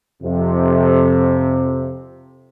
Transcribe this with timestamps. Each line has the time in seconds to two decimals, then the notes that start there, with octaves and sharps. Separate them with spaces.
0.22 F2 C3